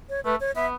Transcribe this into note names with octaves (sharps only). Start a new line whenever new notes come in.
C#5
A3 B4
C#5
B3 E5